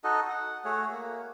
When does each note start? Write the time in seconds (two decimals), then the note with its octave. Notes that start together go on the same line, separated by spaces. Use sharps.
0.04 D#4 F#4 A4 D#5
0.30 F#5
0.65 A3 F#4 G#4 C#5
0.91 A#3